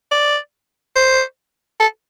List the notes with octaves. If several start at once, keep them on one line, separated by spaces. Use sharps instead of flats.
D5
C5
A4